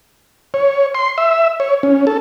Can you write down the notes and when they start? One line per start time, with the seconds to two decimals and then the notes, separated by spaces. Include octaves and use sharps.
0.54 C#5
0.95 C6
1.18 E5
1.60 C#5
1.83 C#4
2.07 A4